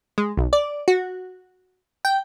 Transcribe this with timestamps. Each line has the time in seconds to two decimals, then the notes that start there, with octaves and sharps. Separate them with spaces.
0.18 G#3
0.37 B1
0.53 D5
0.88 F#4
2.05 G5